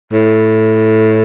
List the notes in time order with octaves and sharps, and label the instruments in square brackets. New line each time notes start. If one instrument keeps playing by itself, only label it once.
[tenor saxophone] A2